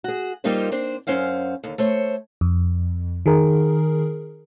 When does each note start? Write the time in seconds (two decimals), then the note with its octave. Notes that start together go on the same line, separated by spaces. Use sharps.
0.04 F#4 G#4
0.44 G3 A#3 D#4 F4 G4 C5
0.72 C4 D4 C5
1.07 F#2 F#3 C#4 C5 F5 F#5
1.64 D#2 D3
1.78 A3 C5 C#5
2.41 F2
3.26 D#3 G#4 A#4